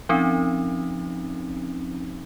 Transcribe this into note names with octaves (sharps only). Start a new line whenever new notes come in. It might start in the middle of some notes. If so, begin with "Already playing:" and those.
F3 C4 C#4 D#4